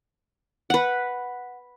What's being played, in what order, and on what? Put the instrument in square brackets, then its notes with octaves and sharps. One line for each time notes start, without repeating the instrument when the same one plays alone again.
[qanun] B4 F#5